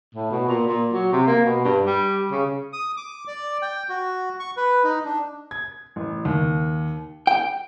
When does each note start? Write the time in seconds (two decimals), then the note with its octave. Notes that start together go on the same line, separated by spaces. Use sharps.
0.15 A2
0.31 B2
0.48 A#2
0.68 A#2
0.93 F#3
1.12 C3
1.27 A#3
1.45 B2
1.64 G2
1.86 G3
2.31 C#3
2.73 D#6
2.97 D6
3.27 D5
3.62 G5
3.89 F#4
4.40 C#6
4.57 B4
4.84 D#4
5.05 D4
5.51 G#6
5.96 A1
6.25 D#2
7.27 G5